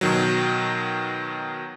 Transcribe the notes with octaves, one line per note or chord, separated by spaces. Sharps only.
B2 D#3 F#3